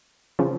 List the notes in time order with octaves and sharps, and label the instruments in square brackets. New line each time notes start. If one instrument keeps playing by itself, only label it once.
[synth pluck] C#3 F3